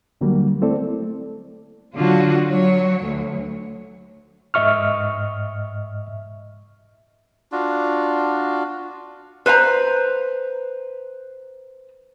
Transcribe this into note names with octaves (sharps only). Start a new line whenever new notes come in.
D2 D3 F#3 G3 A#3
A3 C4 E4 A4 D5
D3 F#3 F4 F#4
F#3 C#5
D2
G#2 D#5 E5 C#6 F6
D4 F4 F#4
B4 C5 F5 A#5